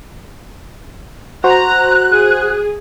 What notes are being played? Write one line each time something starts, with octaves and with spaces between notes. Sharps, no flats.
F#4 C5 A#5 F#6
G#4